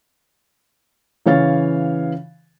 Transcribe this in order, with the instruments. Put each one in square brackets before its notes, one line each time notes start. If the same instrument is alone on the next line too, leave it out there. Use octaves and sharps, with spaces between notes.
[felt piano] C#3 E3 C#5 F5 A6